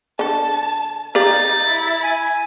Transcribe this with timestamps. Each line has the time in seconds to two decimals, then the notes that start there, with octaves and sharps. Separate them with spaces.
0.19 D3 A4 A5
1.15 D#4 G4 D5 F5 A6
1.67 E4
2.03 G#5